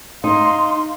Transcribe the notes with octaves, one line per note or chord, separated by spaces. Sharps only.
D#4 F5 C6